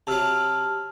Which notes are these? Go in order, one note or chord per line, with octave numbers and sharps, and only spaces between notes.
C3 F#3 A5 E6 F6